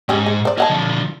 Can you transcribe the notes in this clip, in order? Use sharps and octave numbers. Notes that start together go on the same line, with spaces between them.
G#2 C#4 G4 G#4
G#4
C5 D5
G#4 C#5 D#5 F#5 A5
D3 F3